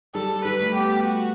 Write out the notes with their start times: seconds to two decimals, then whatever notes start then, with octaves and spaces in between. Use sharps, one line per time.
0.15 G3 A4
0.45 G3 B4
0.60 A3
0.75 B3 G4
1.04 F#4